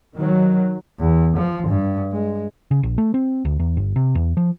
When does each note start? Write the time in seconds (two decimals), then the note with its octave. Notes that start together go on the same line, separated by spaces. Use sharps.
0.17 D#3 F#3
0.99 E2
1.36 F3
1.67 G2
2.12 G#3
2.71 C#3
2.83 A#1
2.98 A3
3.14 C4
3.45 D2
3.59 E2
3.77 G1
3.96 C3
4.15 E2
4.37 F3